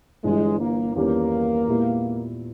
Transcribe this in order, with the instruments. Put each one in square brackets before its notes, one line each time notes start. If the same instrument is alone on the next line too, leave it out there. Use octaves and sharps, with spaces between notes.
[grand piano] G1 G2 E3 [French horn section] G#3
[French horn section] A#3
[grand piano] E2 D#3 G3 C#4 G4 [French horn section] A#3
[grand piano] A#2 G#3 B3 E4 G4